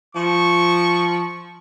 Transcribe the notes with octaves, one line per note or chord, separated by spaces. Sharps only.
F3 C#6